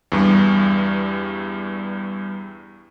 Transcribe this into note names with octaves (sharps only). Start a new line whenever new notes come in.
E2 G2 G3